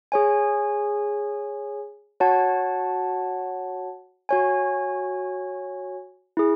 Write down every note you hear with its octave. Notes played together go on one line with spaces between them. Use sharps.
G#4 C#5 G#5
F#4 C#5 F#5 A5
F#4 C#5 G#5
E4 G#4